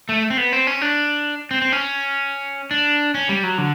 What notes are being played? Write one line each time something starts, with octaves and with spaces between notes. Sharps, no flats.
A3
C4
B3
C4
C#4
D4
C4
C4
C#4
D4
C#4
G3
F#3
D3